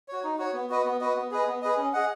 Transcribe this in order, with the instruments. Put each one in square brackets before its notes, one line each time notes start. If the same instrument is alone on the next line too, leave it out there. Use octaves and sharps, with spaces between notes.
[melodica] F#4 C#5
D#4
F#4 C#5
B3
F#4 B4 D#5
B3
F#4 B4 D#5
B3
G#4 B4 D#5
B3
G#4 B4 D#5
C#4
G#4 D#5 F#5